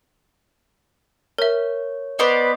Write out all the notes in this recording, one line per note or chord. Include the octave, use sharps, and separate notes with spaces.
A#4 C#5 E5
B3 B4 C5 D5 D#5